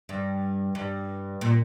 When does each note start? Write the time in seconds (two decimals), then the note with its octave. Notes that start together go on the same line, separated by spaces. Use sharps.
0.09 G2
0.75 G2
1.41 A#2